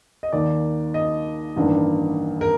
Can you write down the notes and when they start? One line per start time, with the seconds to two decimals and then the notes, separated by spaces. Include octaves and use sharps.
0.23 D#5
0.33 D#2 D#3 A#3 D5
0.94 D#5
1.57 A1 G2 D#3 A#3 D4
2.41 A#4